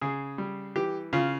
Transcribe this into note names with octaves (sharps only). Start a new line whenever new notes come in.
C#3 G#4
G3
E3 G4
C#3 F4